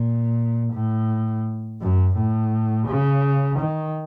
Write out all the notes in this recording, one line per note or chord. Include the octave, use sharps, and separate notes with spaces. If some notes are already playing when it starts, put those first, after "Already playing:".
Already playing: A#2
A2
F#2
A2
C#3
D#3